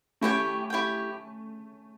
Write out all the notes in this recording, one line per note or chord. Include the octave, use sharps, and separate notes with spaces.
A3 C#4 E4 G4 C#5 G5
E4 G4 C#5 G5